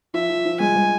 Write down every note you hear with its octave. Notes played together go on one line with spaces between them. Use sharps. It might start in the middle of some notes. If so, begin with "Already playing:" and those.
F3 E5
F3
F3
G#3 G#5
G#3